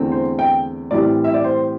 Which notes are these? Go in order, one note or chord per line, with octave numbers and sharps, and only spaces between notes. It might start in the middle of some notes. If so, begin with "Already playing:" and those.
Already playing: E2 D3 A3 C4
C5
G5
A2 E3 G3 C4 D5
E5
D5
C5